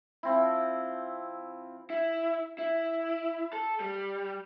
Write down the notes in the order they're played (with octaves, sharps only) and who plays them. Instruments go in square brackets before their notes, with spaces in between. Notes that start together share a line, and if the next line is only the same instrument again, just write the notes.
[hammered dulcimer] F3 C4 E4
[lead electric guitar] E4
E4
A4
G3